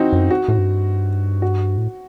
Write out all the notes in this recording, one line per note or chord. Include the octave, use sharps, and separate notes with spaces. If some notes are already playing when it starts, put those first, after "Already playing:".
Already playing: E3 C4 D#4 F#4
F#2
F#4
A2
G2
F#4
A2